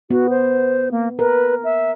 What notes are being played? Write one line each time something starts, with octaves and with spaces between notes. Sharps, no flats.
B3 F#4
C5
A#3
A#4 B4
E5